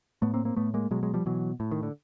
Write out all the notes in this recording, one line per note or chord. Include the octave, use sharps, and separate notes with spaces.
A2 A3 B3
A#3 C4
A#3 C4
A2 A3 B3
G#3 A#3
B2 F#3 G#3
F#3 G#3
F3 G3
B2 E3 F#3
A2
D#3
D3